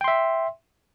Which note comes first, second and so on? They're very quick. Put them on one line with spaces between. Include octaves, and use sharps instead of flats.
G5 C6 E5